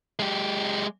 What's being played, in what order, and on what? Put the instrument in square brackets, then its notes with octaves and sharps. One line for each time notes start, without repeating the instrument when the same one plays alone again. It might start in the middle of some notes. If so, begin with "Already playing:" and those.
[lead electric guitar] G#3 G4